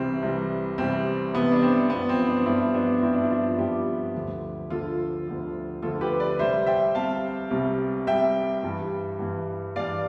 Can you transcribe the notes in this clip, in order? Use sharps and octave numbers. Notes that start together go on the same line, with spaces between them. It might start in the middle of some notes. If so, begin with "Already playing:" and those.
Already playing: C2 C3 E3 G3 C4
C2 C3 E3 G3
C2 C3 E3 G3 C4
C2 C3 E3 G3 B3
D4
C4
G2 F3 B3
C4
B3 D4
G2 F3 C4 E4
B3 D4
G2 F3 C4 E4
D4
E4
D4 F4
G2 F3 E4 G4
D2 D3 F3
D2 D3 F3 F4 A4
D2 D3 F3
D2 D3 F3 F4 A4
G4 B4
B4 D5
C2 C3 G3 C5 E5
E5 G5
C2 C3 G3 F5 A5
C2 C3 G3
C2 C3 G3 E5 G5
G2 E3 G3
G2 E3 G3
G2 E3 G3 D5 F5